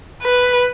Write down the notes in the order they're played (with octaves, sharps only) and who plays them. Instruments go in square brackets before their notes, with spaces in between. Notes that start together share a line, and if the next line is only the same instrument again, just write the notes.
[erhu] B4